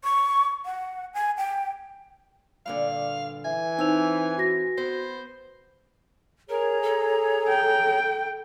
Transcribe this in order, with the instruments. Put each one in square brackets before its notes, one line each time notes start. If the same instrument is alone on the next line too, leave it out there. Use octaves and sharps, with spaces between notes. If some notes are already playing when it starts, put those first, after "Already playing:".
[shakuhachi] C#6
F#5
G#5
G5
[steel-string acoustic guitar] G2 A#2 D3 [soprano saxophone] F5
[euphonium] E3 [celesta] E5 [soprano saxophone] G#5
[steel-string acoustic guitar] C4 [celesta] D#4 E6 F7
[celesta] F#4 A#6
[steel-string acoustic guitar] B3 [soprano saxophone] C5
[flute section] G#4 C#5 A#5 [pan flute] A#4
[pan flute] A4
[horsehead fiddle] G5